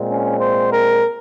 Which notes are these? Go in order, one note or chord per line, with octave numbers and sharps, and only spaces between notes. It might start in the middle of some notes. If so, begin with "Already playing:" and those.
Already playing: A#2 G#3 C4
C#4
C5
A#4